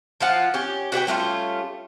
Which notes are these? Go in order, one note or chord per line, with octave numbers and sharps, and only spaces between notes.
F3 F4 F#5
C#4 G4
F#4 B4 C#5 G5
G3 A3 C#4 F4